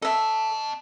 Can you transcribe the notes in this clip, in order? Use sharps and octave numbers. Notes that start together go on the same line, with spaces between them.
A4 D#5 E5 A5